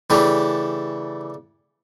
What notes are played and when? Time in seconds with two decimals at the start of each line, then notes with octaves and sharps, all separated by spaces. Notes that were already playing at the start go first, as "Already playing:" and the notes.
0.10 C#3 E3 A3 D4 G4